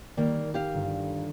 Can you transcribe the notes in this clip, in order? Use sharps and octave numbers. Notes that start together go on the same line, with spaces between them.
D#3 G3 A#3
G4 F5
G1